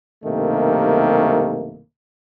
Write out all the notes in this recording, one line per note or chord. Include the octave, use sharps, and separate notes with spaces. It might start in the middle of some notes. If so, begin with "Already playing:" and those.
B1 G2 C3 D#3 A3 A#3